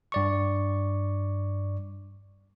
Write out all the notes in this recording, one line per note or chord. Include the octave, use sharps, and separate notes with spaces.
G2 D5 C#6